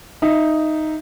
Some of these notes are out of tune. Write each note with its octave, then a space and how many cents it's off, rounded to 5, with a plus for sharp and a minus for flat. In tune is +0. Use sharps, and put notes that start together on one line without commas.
D#4 +0 E5 +10